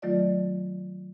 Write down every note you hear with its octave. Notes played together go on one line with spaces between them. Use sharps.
D#3 F#3 A3 F4 D5 D#5